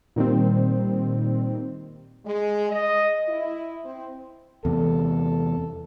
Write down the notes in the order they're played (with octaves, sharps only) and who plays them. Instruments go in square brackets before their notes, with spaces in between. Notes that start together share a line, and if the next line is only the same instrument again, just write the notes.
[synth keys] A#2 D#3 G3 C4
[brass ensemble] G#3
D#5
E4
C4
[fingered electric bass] E2 C3 [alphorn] A4